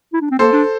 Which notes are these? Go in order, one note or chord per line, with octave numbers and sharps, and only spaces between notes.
E4
D4
C4
A#3 A4 C5
D4